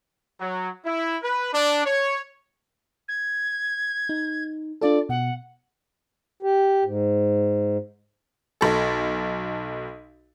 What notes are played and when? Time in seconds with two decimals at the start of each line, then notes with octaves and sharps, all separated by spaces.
0.40 F#3
0.85 E4
1.23 B4
1.53 D4
1.85 C#5
3.08 G#6
4.09 D#4
4.81 D4 F4 A4 D5
5.09 B2 F#5
6.43 G4
6.85 G#2
8.61 B1 A4